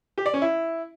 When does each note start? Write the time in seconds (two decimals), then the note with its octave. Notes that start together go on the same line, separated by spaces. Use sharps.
0.18 G4
0.26 D5
0.34 C#4
0.42 E4